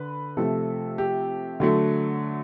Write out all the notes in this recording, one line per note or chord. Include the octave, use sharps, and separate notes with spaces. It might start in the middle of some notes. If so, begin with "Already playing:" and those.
Already playing: D3 B4
C3 F3 A3 A4
G4
D3 F#3 A3